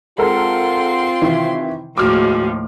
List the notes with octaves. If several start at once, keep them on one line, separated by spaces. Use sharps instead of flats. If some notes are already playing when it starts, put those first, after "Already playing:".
G#3 C4 F4 A4 A#4 F#5 C6
C3 D#3 E3 E5
D#2 A2 F3 G#3 F#4 D6 F6